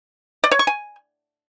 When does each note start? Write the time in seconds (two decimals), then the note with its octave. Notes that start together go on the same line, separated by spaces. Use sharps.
0.44 D5
0.51 C#5
0.59 C#6
0.67 G#5